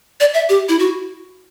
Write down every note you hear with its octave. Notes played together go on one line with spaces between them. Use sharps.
D5
E5
G4
E4
F#4